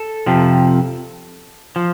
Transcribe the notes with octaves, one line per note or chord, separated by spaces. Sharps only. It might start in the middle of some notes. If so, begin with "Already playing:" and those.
Already playing: A4
F2 C3 F3
F3